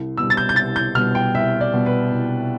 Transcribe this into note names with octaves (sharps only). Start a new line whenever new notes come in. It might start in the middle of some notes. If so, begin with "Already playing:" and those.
Already playing: C2
B2 G3 E6
A6
G6
G6
C2 A6
G6
B2 G3 F6
G5
C2 E5
D5
B2 G3
B4
C2